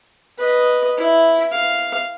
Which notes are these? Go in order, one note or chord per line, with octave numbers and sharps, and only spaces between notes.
B4 D#5
E4
F5